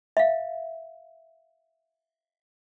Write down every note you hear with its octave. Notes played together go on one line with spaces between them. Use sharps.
E5 F5